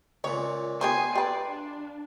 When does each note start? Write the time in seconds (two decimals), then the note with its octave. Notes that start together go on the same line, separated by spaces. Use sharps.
0.24 C#2 A#2 C#5
0.81 B3 F4 G4 C5 G#5 C7
1.15 G4 B4 D5
1.50 D4